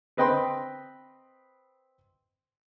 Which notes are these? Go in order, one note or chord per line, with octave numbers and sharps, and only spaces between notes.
C4 B4 D#5 G5 B5 C6